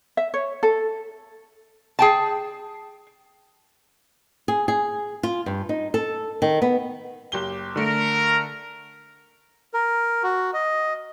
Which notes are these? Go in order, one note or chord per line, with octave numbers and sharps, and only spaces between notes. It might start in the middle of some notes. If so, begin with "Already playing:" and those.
E5
C#5
A4
G#4 G5 A5
G#4
G#4
F4
G2
D#4
A4
D#3
B3
F#1 G4 G7
D3 A3 A#4
A#4
F#4
D#5